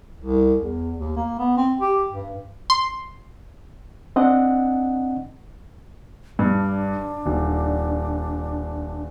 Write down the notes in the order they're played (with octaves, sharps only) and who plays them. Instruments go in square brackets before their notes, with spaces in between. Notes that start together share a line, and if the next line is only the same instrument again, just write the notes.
[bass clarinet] C2
E2
D#2
A#3
B3
C4
G4
G2
[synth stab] C6
[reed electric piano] C4 D4 D#5 F#5
[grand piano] G2 [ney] D4
[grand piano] D#1